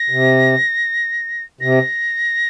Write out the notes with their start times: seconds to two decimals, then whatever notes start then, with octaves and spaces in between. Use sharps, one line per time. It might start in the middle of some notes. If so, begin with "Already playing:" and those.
Already playing: A#6
0.10 C3
1.61 C3 A#6